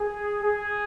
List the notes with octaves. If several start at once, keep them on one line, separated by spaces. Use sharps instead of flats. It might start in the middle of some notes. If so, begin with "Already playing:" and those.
Already playing: G#4
G#4